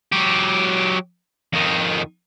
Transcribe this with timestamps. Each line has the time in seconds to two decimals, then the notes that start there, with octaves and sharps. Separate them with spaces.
0.12 F#3 G4
1.53 F2 D#3